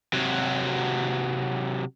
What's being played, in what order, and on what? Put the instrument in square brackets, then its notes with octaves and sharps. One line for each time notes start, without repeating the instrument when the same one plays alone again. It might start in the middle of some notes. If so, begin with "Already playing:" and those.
[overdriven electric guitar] C3 F#3